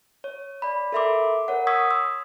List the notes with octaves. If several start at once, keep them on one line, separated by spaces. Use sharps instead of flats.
C#5
D5 B5
A4 A#4 E5 B5 C6 D6
A#4 C#5 F#5
C#6 D#6 E6 G#6 B6
C6 E6